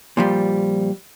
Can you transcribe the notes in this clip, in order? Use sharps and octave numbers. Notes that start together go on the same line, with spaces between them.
A#2 F3 G3